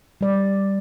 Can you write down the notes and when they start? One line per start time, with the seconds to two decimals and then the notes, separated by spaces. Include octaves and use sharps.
0.21 G3 D5